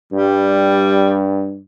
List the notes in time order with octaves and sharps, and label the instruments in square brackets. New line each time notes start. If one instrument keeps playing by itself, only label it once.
[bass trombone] G2 [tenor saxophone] G3